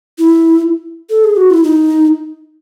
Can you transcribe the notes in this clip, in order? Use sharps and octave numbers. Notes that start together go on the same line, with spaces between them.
E4
A4
G#4
F#4
E4
D#4